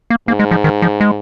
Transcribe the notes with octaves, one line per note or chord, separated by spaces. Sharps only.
A#3
G#2 A#3
G#3
F3
D#3
F3
G#3